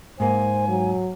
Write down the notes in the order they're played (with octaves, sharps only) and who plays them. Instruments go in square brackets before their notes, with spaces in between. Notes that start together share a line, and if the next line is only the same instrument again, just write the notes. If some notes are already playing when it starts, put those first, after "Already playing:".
[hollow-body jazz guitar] G#2 A#3 [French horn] C5 [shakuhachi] G#5
[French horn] F#3